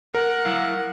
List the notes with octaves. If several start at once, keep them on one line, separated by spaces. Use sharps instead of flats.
A#4 F#5
F#3 E4 F5